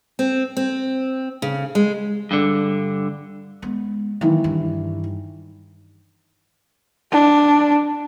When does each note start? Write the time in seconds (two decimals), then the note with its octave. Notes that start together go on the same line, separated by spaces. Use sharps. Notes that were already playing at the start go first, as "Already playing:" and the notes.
0.19 C4
0.57 C4
1.42 C#3
1.75 G#3
2.31 G2 D3
3.62 G#3 B3
4.21 D#3 E3 F#3 A#3
4.44 G2
7.12 D4